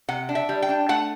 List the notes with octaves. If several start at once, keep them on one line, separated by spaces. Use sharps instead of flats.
C3 F#5
D4
E5
G3
G5
D4
A3 F#5